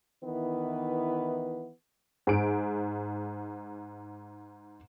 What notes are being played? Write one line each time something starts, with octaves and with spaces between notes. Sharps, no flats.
D#3 E3 B3 E4 B4
G#2 D7